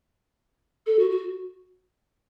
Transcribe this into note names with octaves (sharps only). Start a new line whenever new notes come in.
A4
F#4
F#4